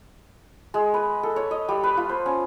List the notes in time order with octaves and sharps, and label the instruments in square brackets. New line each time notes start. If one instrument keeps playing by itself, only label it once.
[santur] G#3
B4
A4
C#5
D#5
G3
B4
F4
C5
C#4